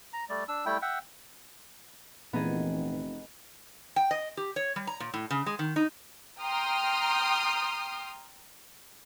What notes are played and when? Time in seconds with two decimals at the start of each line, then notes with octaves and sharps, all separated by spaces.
0.13 A#5
0.30 G3 A3 D5
0.48 D4 E6
0.66 G3 A3 E4 G5
0.82 E5 F#5 G5
2.33 F1 A#2 E3 B3 D#4 G#4
3.96 G5
4.11 D#5
4.37 G4
4.56 C#5
4.76 G3
4.87 A#5
5.00 A#2
5.14 A2
5.31 C#3
5.46 G#3
5.59 D#3
5.76 D#4
6.41 G5 A#5 C6 D#6 F6